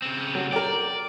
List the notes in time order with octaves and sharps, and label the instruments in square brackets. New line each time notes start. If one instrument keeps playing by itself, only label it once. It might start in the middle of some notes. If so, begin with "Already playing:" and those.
[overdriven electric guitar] C#3 C4
[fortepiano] F#3
[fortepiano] A#4 G5 [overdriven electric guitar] D5